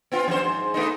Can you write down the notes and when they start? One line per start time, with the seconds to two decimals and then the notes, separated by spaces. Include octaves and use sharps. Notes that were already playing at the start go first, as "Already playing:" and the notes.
0.12 B3 C4 F4
0.28 F2 C5
0.44 G#2
0.74 A3 B3 D#4